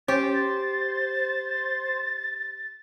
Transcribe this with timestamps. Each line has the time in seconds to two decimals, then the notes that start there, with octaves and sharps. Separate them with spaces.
0.08 C#4 G4 C5 A6